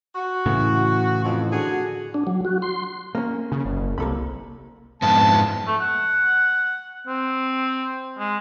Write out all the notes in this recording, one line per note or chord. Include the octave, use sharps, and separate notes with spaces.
F#4
A2 C#3 E3
F2
D3 F#4 G#4
D4
F#3
F#4
C6
A#3 C#4
C#3
F#1
C2 A#3 A4 B5
F2 G#2 B3 A5
A3
F#5
C4
G#3